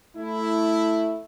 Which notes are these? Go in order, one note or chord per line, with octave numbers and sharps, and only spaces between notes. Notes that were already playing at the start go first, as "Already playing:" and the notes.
A3 E4